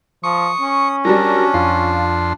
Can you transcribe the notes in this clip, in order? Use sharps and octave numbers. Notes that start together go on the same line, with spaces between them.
F3 C#6 D#6
C#4
F#3 G3 D4 A#4
F2 F4 C6